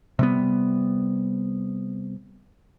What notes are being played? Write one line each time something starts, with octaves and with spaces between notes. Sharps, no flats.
C3 G3 B3